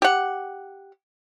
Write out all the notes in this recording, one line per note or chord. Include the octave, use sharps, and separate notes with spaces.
G4 F#5